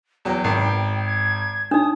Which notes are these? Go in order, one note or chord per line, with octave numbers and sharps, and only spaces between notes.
E2 F#3 G5
G#1
G#6
D4 D#4 D#6